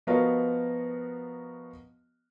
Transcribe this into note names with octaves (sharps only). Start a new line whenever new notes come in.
F3 B3 F#4 A#4 D#5 F5